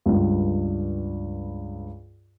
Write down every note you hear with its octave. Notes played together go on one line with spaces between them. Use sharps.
C#2 G2